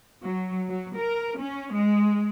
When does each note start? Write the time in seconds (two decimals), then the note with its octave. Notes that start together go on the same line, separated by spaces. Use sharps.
0.23 F#3
0.69 F#3
0.97 A#4
1.37 C#4
1.75 G#3